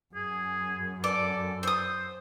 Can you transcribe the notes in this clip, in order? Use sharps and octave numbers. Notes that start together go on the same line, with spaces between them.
F#2 G#4
A4 D5
C5 D#6 E6